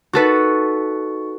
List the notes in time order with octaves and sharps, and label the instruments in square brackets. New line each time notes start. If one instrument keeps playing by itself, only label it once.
[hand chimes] D#4 C#6 [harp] F#4 A4 B4